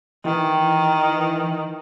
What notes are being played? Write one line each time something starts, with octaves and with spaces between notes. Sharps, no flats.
D#3 E3